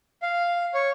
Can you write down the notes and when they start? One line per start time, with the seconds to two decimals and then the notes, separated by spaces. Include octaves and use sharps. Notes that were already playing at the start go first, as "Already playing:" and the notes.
0.22 F5
0.74 C#5